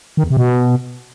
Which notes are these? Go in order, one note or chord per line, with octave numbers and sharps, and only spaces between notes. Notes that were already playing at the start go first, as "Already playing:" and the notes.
D#3
E2
C3
B2